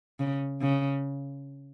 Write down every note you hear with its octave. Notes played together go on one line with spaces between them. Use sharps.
C#3
C#3